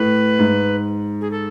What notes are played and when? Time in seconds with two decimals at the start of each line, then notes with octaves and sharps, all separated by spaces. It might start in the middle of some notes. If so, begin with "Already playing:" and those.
Already playing: A2 B4
0.39 G#2
1.21 G#4
1.31 A4